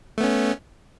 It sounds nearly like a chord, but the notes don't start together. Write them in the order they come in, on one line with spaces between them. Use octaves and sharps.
A3 B3 C#4